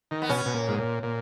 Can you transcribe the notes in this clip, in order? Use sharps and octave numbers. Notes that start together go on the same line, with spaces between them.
D#3
B3
B2 C#4
B2
A#2
G#2
A#2
A#2